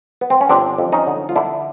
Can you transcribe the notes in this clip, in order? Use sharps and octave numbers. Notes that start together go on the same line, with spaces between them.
B3
C4
C#4
G1 C4 D4
F2
C#4 D#4
D3
F4
D3 D4 E4